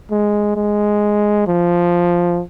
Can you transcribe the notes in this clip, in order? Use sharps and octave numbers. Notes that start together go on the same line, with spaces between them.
G#3
G#3
F3